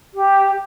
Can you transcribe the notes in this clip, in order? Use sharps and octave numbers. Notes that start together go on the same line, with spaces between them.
G4